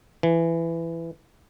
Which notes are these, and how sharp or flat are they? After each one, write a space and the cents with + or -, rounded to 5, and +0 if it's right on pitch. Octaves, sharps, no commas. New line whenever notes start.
E3 +15